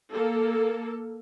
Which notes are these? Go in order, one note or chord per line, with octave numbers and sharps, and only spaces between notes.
A#3 A4